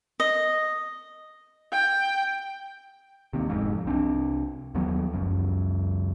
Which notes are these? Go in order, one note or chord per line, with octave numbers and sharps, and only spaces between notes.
D#5
G5
D#2 C3
F1 F2 G#2
C2 C4 D4
D#2 F3 F#3 B3
F#1 C#2 F#2